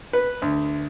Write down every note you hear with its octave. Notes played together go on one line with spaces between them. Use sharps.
B4
D2